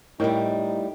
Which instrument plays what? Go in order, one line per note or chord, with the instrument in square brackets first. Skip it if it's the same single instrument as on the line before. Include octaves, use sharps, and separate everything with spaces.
[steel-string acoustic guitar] A2 G3 [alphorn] D#4 [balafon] E4 A#4 D#5